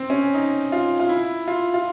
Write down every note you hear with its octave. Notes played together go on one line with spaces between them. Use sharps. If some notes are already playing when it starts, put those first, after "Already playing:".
Already playing: C4
C#4
D#4
F4
F4
E4
F4
F4